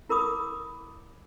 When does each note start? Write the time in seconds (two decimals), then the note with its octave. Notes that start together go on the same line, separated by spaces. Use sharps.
0.09 E4 A#4 B5 D6 D#6